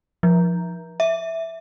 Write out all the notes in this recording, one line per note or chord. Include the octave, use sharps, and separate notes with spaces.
F3
E5